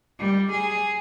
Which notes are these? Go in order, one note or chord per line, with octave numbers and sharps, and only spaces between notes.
G3
G#4